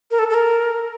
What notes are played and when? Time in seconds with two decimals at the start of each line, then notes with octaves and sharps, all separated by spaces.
0.11 A#4
0.19 A4
0.30 A4
0.34 A#4